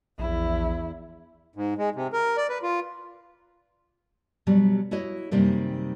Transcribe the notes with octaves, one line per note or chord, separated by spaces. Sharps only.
A#1 E2 E4
G#2
G#3
C3
A#4
D5
B4
F4
B2 F#3 G3
E4 F#4 C#5 D#5
F#2 C3 D#3 G3 A#3